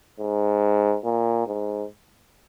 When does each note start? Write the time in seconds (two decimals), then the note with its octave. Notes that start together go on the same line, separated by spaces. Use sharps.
0.20 G#2
1.04 A#2
1.47 G#2